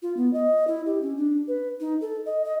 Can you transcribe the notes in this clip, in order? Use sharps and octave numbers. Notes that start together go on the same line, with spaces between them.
F4
B3
D#5
E4
G4
C#4
D4
B4
D#4
A4
D#5
D#5